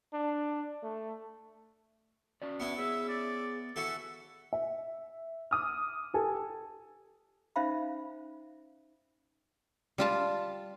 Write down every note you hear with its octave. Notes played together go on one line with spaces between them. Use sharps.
D4
A3
C#4 F#4 D5
B3 E4
G#4 C#5 E5
D5
E3 F#4 A4 E5
E5
D6 D#6 F6
G4 A4 G#5
C#4 D#4 C5 E5 F5 B5
G3 F4 A5